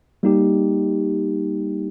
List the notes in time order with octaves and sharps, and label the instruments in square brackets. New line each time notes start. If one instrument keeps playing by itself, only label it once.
[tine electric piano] G3 A#3 D#4 G4